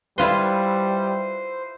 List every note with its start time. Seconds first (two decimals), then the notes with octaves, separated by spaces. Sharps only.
0.18 G3 E4 F4 B4 C5 E5 C6